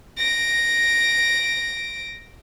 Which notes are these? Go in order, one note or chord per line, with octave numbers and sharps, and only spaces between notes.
A#6 D7